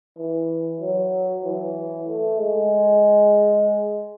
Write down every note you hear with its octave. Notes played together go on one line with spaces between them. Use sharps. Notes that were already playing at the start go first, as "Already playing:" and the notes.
E3
F#3
E3
A3
G#3